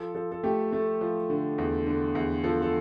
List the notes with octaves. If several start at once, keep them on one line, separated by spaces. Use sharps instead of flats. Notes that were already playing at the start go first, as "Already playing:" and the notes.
Already playing: F3 A4
F3 A4
A4
A3 G4
A3
F3
D3
E2
D3
E2
F3 A4
A4